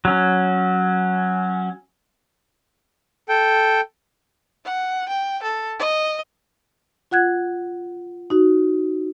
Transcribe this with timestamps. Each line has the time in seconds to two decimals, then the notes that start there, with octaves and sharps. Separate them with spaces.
0.05 F#3 C#4
3.29 A4 G5
4.65 F#5
5.09 G5
5.43 A4
5.79 D#5
7.11 F4 F#5 F#6 G#6
8.30 D#4 F#4